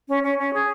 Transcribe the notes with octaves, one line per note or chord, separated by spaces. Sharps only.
C#4
C#4
C#4
G#4